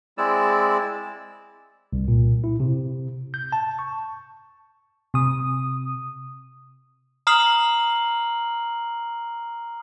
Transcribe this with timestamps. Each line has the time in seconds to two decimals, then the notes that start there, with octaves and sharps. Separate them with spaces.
0.18 G#3 C4 E4 D5 E6
1.93 C2
2.08 A#2
2.44 E4
2.60 C3
3.34 G6
3.52 A5
3.79 C#6
5.14 C3 D#6
7.27 A#5 D#6 F6 C7 F#7